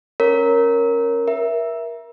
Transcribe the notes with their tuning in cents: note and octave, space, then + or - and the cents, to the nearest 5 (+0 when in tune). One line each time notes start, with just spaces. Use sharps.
C#4 -15 A#4 +0 C#5 -5
A#4 +30 E5 +0